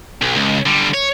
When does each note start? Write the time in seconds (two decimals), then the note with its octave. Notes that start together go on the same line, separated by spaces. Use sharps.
0.22 B1
0.36 C#2
0.66 D3 G3
0.94 C#5